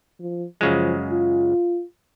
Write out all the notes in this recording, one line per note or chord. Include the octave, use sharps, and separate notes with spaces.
F3
F#2 C#3 F3 G#3
F4